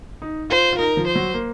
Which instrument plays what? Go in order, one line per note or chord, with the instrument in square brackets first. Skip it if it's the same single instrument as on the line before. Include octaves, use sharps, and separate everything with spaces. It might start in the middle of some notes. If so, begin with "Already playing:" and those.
[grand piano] D#4
[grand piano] F4 [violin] C5
[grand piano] F4
[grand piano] D#4 [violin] A#4
[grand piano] F3
[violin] C5
[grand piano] F#3
A#3